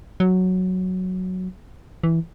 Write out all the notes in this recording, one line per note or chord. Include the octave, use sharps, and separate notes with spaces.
F#3
E3